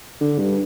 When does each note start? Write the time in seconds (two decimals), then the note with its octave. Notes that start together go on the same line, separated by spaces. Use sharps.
0.21 D3
0.39 G2